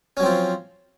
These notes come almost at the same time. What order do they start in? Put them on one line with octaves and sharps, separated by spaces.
C#4 F#3 C4 F3